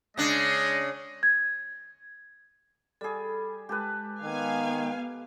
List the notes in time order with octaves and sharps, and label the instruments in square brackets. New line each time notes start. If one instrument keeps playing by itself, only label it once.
[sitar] C#3 D4 [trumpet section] G#3 D#5
[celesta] G#6
[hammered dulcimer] G3 G#4 [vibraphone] A4 B5
[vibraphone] G#3 [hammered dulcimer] G4 A4 B4
[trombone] D#3 [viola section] B3 F5 G#5